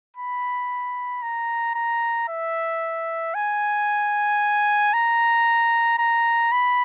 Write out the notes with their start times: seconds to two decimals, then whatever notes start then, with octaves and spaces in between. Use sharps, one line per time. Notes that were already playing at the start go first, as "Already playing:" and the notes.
0.17 B5
1.22 A#5
1.75 A#5
2.29 E5
3.35 G#5
4.93 A#5
5.98 A#5
6.52 B5